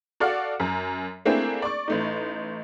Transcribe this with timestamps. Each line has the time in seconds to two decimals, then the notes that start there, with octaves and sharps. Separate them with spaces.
0.20 F#4 A4 D5 F5 F#5
0.60 F#2 A#5
1.25 A3 A#3 C4 D4 E4 G#4
1.62 D5 C#6
1.88 A1 A3 D#4